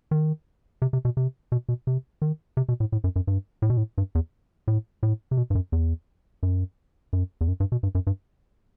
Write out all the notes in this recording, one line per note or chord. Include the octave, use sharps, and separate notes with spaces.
D#3
C3
C3
B2
C3
B2
B2
C3
D#3
C3
B2
A2
A2
F#2
F#2
G2
A2
B2
A2
G2
E2
A2
A2
C3
B2
G2
F#2
E2
F#2
F#2
E2
F#2
G2
B2
G2
F#2
G2